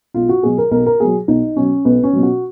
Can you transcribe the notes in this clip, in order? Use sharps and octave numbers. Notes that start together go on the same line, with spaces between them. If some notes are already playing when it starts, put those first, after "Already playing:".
B1 F4
F#4
B2 F#3 G#4
A#4
B1 A#4
A#4
B2 F#3 G#4
B1 D#4
B2 F#3 C#4
B1 B3
C#4
B2 F#3
F#4